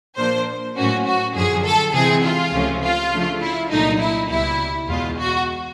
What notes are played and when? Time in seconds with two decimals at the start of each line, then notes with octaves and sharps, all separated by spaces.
0.17 A#2 F3 A#3 D4 C5
0.75 A2 F#3 A#3 C#4 F#4
1.05 F#4
1.34 F#2 D3 F3 G#4
1.64 A4
1.94 C3 E3 G#3 C4 G#4
2.23 F4
2.52 C#2 C3 F3 A3 C#4
2.83 F4
3.11 C#3 F3 A3 D4
3.41 E4
3.71 C2 A#2 F#3 A3 D4 D#4
4.00 E4
4.30 C#2 B2 G3 E4
4.88 E2 B2 G#3 F4
5.18 F#4